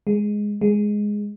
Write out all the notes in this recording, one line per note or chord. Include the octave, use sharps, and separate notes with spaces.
G#3
G#3